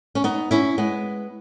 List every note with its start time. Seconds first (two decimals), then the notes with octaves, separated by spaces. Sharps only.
0.15 C#4
0.24 B3 D#4
0.51 C#4 E4
0.78 G#3 B3